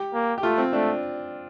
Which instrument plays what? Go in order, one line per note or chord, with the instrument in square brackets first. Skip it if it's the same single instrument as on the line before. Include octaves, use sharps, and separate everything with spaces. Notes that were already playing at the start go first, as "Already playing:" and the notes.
Already playing: [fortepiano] G4
[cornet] A#3
[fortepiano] G4
[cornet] A3 [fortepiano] F4
[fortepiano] C4
[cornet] A3 [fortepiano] D4